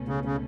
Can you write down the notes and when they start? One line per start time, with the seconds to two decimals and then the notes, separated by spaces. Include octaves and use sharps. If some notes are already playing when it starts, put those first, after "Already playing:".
Already playing: C#2 B2 A3 C#4
0.08 C#3
0.25 C#3